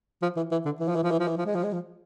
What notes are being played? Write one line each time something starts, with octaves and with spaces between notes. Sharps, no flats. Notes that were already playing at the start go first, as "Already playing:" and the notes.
F3
E3
E3
D3
E3
F3
E3
F3
E3
F3
E3
F3
G#3
F3
G#3
F3